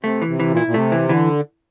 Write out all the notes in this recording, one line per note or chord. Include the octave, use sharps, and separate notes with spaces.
C3 A3
E3
C3
E3
A#2
E4
A#2
C3 A3
E3
D3 E3